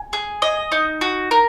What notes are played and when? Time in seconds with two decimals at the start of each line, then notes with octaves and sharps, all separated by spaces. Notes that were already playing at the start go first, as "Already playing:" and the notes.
Already playing: G#5
0.13 G#4
0.42 D#5
0.72 D#4
1.01 F#4
1.31 A#4